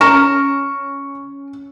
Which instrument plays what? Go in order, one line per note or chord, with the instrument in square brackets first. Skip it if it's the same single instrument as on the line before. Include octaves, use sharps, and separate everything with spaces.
[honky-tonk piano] C#4 [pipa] A#4 [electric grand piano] C#6 E7